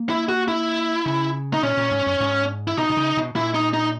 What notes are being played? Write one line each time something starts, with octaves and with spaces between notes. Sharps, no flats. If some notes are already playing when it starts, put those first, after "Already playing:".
Already playing: A#3
E4
F#4
E4
C#3
D#4
A#2 C#4
A#2
G#2
F#2
G#2
E4
B2 D#4
B2
C#3
B2
A#2 E4
D#4
D#4